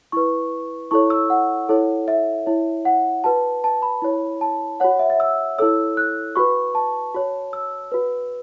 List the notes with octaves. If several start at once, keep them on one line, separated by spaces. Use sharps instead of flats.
E4 B4 C#6
E4 A4 C#5 C#6
E6
F#5
E4 A4 C#5
E5
E4 C#5
F#5
F#4 B4 A5
A5
B5
E4 C#5
A5
F#4 C#5 F#5
E5
E5
E6
E4 A4 C#5 E6
F#6
F#4 B4 C#6
A5
F#4 C#5
E6
F#4 B4